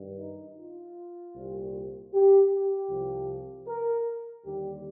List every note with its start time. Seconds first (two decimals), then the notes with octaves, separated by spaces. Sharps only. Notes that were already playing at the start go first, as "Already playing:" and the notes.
Already playing: G2 D#3 G3
0.18 D#4
0.58 F4
1.35 C2 A#2 G3
2.13 G4
2.51 G4
2.90 C2 C3 F3
3.67 A#4
4.45 D#2 D3 G3 G4